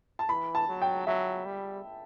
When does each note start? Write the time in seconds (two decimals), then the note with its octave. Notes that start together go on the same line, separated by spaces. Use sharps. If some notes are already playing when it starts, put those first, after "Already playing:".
0.19 A5
0.29 E3 B5
0.55 A5
0.68 F#3
0.82 G5
1.07 F#3 E5
1.46 G3